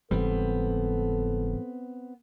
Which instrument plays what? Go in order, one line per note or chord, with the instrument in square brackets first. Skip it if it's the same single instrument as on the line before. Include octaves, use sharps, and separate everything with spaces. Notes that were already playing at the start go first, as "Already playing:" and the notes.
[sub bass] F#1 [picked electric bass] G#2 E3 G3 [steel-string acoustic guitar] B3 C4 [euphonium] A4